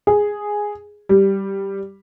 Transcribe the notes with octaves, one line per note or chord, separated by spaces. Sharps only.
G#4
G3